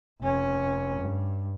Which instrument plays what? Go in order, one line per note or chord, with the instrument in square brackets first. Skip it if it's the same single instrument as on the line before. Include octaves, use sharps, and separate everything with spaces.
[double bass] F1 C#4
G2